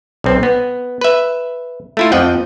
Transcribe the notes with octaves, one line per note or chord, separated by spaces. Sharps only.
B1 C4
B3
B4 E5
A3 E4 F4
F2 F3 D#5 F#5 G5